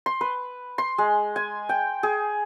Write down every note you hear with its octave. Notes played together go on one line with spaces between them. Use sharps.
C6
B4
C6
G#3
G#5
G5
G#4